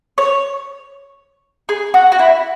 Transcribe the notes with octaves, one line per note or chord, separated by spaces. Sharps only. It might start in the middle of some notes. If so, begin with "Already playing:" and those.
C#5
G#4
F#4
F#4
E4